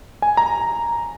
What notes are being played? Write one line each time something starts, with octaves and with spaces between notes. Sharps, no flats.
G#5
A#5